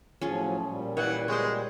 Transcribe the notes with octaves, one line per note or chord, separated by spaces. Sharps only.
A2 F3 F#3 C#4 F4 G#4
A#2 G3
E3 C#5 F#5
G#3 C4 C5 C#5